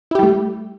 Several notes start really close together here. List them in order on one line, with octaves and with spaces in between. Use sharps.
E4 G4 G3 A3